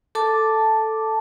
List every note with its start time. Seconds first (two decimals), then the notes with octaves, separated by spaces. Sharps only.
0.15 A4 A5 D6